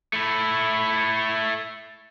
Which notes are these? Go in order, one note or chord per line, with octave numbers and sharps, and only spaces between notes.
A3 E4